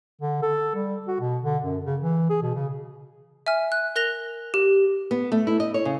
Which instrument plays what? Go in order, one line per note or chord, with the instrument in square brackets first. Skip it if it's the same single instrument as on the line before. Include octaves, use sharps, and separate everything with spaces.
[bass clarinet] D3
A4
G3
F#4
B2
D3
F#2
C#3
E3
G#4
B2
C#3
[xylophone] E5 G#5 F6
F#6
A#4 F#6 A#6 F7 G7
G4
[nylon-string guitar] B3
A3
E4
D#5
C#5
C#3